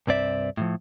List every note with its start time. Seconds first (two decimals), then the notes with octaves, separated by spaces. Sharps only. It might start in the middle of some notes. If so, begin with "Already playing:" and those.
0.07 C2 G2 C4 D5 E5
0.57 A2 C3 F3